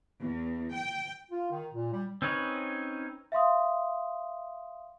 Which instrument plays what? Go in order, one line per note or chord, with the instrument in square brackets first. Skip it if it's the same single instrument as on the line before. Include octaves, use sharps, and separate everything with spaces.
[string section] E2
G5
[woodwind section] F4
D#3
A#2
G3
[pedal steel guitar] C4 C#4 D#4 B4 C#5
[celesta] E5 F5 C6 D#6